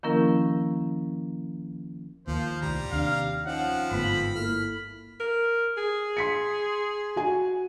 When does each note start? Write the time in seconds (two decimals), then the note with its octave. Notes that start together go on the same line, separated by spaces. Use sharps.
0.03 D#3 F3 A#3 C#4 E4 A#4
2.27 D#2 F3 A#3 C5
2.61 C2 A2 D#3 G3 A#5
2.92 D#2 C3 D4 F5
3.46 F3 C4 C#4 D#4 F#5
3.91 G1 G#2 A3 B3 F4 B5
4.35 A#3 E4 A4 F6
5.20 A#4
5.77 G#4
6.17 C6 B6 C#7
7.16 F#4 G#5